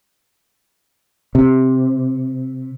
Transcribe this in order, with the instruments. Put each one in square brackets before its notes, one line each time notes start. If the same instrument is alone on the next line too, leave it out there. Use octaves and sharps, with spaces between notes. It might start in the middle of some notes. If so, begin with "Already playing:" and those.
[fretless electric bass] C3